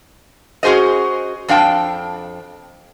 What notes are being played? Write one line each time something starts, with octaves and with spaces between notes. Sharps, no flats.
C#4 F#4 G#4 C5 D#5
F2 D4 F5 G5 A5